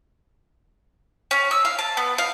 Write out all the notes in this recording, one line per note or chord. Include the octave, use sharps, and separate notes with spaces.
C#4
E6
F5
A5
B3
F5